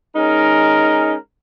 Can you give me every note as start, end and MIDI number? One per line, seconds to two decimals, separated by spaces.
0.15 1.14 56
0.15 1.14 61
0.15 1.14 63
0.15 1.14 70